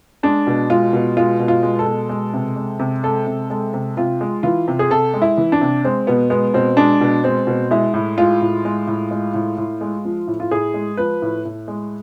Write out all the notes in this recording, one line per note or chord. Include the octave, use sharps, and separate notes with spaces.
G#3 D4
B2
G#3 F4
B2
G#3 F4
B2
F4
G#3
A4
B2
G#3
C3
G#3
C3
G#3 A4
C3
G#3 A4
C3
C3 F4
G#3
E3 F4
C3
G#4
C3 A4
G#3
E4
E3
D4
C3
G#3 C4
B2 B3
G#3 B3
B2 C4
G#3 D4
B2
G#3 C4
B2
G#3 E4
A2
G#3 F4
A2
G#3
A2
G#3
A2
A2
G#3
F3
A2
F4
A2 G#4
G#3
F3 B4
A2
A2
G#3